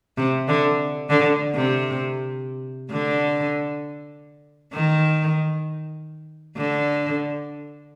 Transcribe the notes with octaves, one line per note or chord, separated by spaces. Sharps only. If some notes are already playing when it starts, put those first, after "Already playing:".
C3
D3
D3
C3
D3
D#3
D3